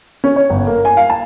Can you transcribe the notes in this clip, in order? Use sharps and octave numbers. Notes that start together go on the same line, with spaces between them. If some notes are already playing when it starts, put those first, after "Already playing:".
C#4
C#5
G1
A#3
G#5
F5
A5